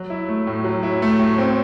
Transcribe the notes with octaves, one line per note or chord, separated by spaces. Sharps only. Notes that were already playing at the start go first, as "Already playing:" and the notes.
Already playing: F#3
E4
A3
A2
F#3
E4
A3
A2
C4